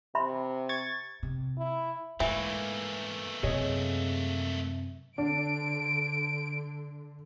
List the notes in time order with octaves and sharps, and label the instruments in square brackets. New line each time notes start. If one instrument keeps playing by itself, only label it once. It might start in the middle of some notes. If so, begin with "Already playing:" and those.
[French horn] C3 [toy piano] E5 B5 C6
[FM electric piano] C#6 G#6 A6
[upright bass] C3
[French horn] E4
[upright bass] G#2 [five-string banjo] E3 [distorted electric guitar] A3 A#3
[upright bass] F#2 C3 [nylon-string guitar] G#4 C#5 D#5
[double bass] D3 [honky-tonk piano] D4 [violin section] D7